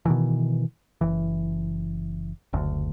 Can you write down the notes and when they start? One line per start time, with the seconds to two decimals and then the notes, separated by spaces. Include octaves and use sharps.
0.06 B2 D#3 E3
1.01 F#1 E3
2.53 F#1 D2